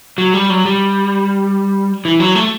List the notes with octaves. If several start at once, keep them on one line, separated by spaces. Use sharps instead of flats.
F#3
G3
F#3
G3
E3
F#3
A3